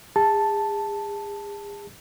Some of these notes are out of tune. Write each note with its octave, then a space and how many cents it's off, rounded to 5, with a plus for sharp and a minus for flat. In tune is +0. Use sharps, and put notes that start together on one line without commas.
G#4 -35 A5 +0